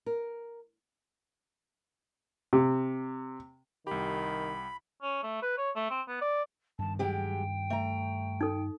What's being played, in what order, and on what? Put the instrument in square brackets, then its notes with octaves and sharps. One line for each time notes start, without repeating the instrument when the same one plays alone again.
[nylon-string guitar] A#4
[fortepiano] C3
[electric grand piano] C2 G4 [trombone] D#3 [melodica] B5
[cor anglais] C#4
A3
B4
C#5
A3
C4
B3
D5
[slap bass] G2 D#3 [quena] A5
[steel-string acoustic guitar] F#3 G#3 G4 [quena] G5
[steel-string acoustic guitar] A3 A#5
[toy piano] D#4 A4